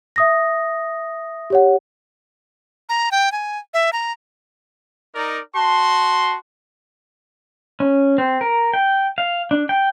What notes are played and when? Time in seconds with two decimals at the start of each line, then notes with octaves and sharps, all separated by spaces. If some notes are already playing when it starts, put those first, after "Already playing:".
0.16 E5 D#6 A#6
1.50 G4 C#5 F#5
2.89 A#5
3.11 G5
3.32 G#5
3.74 E5
3.93 A#5
5.15 D#4 A#4 D5
5.55 F#4 A5 C6
7.80 C#4
8.18 C4
8.41 A#4
8.74 G5
9.18 F5
9.51 D4
9.69 G5